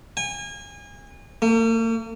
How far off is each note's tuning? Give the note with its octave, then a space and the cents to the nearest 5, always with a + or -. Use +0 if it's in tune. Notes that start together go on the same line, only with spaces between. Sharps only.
G#5 -30
A#3 -45